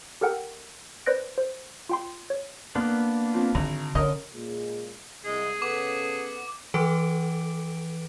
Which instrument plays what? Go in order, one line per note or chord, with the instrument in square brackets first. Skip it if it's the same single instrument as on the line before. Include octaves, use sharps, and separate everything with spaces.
[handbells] G4 A4 A#4 F#5 G5
B4 C5 D5 F#6 A#6 D7
C5
F4 G5 C6
C#5
[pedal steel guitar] A#3 B3 D4
[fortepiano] F3 C4
[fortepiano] G#1 [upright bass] D3 [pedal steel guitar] A#5
[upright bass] D3 [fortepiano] C#4 A#4 D#5
[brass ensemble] A#2 C#3 G#3
[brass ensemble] C2 [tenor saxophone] G#3 [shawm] G#4
[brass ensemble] C#3 A4 [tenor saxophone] B3 [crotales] D6
[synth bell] E3 F3 A4 B4 D6 D7